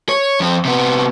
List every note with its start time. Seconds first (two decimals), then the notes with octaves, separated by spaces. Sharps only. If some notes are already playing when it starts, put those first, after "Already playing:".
0.09 C#5
0.40 F2 C4
0.65 C3 B3